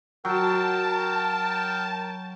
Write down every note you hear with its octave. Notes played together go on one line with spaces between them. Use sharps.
F#3 A#4 G5 A5